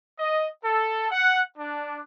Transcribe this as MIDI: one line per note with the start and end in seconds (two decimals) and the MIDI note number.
0.19 0.47 75
0.64 1.10 69
1.10 1.41 78
1.58 2.00 62